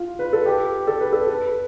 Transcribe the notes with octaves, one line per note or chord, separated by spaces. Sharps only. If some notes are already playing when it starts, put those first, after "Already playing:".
Already playing: F4
B4
A4
G4
A4
B4
A4
B4